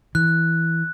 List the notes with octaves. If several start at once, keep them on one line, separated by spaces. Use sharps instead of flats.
E3 F#6